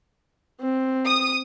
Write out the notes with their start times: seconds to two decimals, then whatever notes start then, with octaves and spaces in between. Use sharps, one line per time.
0.60 C4
1.06 D#6